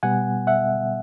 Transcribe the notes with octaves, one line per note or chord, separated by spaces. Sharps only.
B2 G3 B3 F#5 G#5
E5 F#5